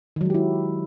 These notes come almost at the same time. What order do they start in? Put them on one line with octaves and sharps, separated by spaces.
D#3 F#3 G#3 G4 E4